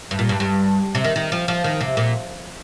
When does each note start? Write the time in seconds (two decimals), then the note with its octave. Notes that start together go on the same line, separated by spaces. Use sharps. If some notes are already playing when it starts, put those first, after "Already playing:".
0.11 G2
0.19 A#2
0.29 G2
0.40 G2
0.95 C3
1.04 D#3
1.16 D#3
1.32 F3
1.48 F3
1.64 D#3
1.81 C3
1.97 A#2